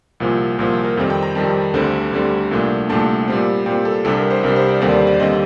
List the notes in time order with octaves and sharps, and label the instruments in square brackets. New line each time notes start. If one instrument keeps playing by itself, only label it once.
[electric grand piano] C2 A#2 F3
C2 A#2 F3 A#4
A#4
F2 D#3 G3 C4 A4
G5
A#5
F2 D#3 G3 C4 A5
D2 D3 G3 C4
D2 D3 G3 C4
C2 A#2 A3 D4
C2 A#2 A3 D4 A5
A#2 G3 C4
A#2 G3 C4 G5
A4
C2 C3 G3 D4 A4
A#4
C5
C2 C3 G3 D4 A#4
C5
D5
D#2 D3 G3 C4 A#4
D5
C5
D5
D#2 D3 G3 C4 D#5